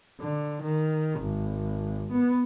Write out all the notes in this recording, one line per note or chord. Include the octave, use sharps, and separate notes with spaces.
D3
D#3
G#1
B3